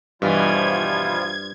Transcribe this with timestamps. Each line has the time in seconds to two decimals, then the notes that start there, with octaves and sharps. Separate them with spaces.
0.22 G2 B2 E3 F3 G3 F4 G#6